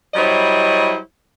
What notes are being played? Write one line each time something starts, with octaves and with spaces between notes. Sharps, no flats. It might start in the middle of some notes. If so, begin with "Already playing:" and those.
F#3 G3 E4 C5 C#5 D#5